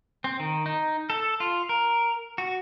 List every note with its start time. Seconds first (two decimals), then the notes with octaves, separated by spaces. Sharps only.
0.24 C4
0.40 D#3
0.66 D#4
1.10 A4
1.40 F4
1.69 A#4
2.38 F#4